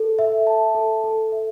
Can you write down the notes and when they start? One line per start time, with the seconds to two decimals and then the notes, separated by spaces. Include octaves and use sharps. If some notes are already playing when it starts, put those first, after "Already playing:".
Already playing: A4
0.19 E5
0.47 A5
0.75 A4
1.04 A4
1.32 E5